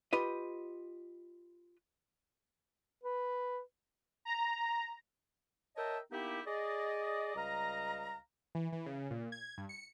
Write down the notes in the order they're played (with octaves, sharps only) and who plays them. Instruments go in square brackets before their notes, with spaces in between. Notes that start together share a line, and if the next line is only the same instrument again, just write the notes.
[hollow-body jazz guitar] F4 G4 B4 D#5
[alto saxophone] B4
[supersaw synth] A#5
[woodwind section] A#4 C#5 D#5 E5 G5 A5
A#3 B3 D#4 E4 G4
G#4 D5 D#5
C#2 G3 D#5 F5 A#5
[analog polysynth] E3
E3
C#3
A#2
G#6
G2
C#7